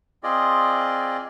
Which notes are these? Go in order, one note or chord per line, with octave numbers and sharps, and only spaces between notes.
C4 F4 G#4 D5 D#5